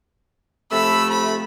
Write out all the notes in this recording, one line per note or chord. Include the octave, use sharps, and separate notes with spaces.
C3 F3 A3 B5 E6
B5